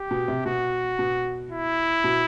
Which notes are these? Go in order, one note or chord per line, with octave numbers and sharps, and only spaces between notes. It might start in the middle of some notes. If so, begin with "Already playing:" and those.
Already playing: G4
B2
C3
B2 F#4
B2
E4
B2